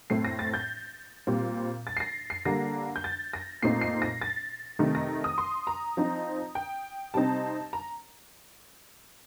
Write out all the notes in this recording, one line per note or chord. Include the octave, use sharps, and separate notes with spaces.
A2 A3 C4 C7
A#6
A6
G6
A#2 G3 C4
A6
C7
A#6
C7
D3 G3 A#3 D4 A#6
G6
A6
A#6
A#2 A3 C4 D#4 C7
C7
A#6
A6
C3 D#3 A3 D#4
A#6
D#6
C6
A#5
F3 C4 D#4
G5
C3 G3 C4 D#4 A5
A#5